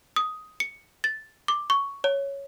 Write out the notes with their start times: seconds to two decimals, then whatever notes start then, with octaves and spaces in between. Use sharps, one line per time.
0.16 D#6
0.60 C#7
1.04 A6
1.48 D6
1.70 C#6
2.04 C#5